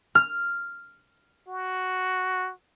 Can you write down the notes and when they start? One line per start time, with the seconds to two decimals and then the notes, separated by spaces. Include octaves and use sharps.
0.15 F6
1.48 F#4